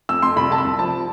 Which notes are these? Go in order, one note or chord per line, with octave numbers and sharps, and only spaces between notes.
F2 E6
F2 C6
C2 B5
C2 A5
B5
C2
F3 A5